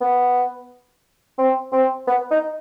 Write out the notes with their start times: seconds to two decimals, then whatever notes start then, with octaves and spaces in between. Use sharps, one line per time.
0.01 B3
1.38 C4
1.73 C4
2.07 B3
2.31 D#4